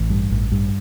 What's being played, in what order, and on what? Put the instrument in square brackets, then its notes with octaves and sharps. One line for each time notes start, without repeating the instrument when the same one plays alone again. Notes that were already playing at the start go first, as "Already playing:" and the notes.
Already playing: [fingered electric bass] A1 E3
G2
A1
G2